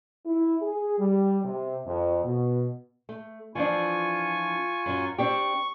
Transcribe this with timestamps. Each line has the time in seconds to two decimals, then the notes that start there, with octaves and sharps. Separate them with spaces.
0.26 E4
0.62 G#4
1.00 G3
1.45 C3
1.86 F2
2.24 B2
3.09 A3
3.55 E3 F3 D4 F4 G#5 C#6
4.86 F#2 F#3
5.18 C4 D4 G4 C#6